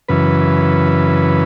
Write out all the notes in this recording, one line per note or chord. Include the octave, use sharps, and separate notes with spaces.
F#2 C#3 E3 B4